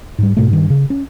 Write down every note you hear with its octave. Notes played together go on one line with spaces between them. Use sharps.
G#2 G3
G#2 B2 A3
G2 D#3
C#3
C#4